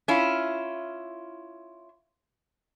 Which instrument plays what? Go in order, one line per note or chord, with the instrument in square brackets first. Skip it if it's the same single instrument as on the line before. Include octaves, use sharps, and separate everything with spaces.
[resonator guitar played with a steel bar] C#4 E4 F4